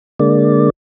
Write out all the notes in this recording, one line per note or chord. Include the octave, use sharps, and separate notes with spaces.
D3 G#3 A#3 D5